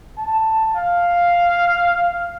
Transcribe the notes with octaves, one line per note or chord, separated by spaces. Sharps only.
A5
F5